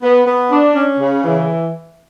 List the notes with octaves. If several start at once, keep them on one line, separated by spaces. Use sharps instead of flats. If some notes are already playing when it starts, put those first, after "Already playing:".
B3
B3
D4
C#4
C#3
E3